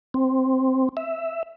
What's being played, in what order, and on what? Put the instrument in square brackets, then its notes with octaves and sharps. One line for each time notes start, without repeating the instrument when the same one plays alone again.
[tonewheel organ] C4
E5